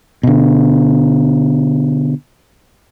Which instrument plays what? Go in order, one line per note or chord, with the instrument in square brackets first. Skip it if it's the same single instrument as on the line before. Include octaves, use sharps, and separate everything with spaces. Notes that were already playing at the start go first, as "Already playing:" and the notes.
[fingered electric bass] B2 D3